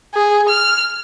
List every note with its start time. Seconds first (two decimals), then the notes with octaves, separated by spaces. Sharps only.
0.15 G#4
0.49 F6